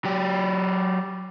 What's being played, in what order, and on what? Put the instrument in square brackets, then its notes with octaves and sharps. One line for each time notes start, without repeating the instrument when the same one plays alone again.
[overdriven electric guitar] F#3 G4